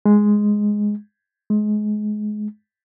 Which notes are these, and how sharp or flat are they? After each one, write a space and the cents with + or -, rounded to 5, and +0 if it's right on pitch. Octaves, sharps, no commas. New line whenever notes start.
G#3 +0
G#3 +25